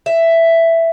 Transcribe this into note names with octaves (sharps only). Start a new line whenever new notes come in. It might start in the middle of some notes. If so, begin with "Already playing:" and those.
E5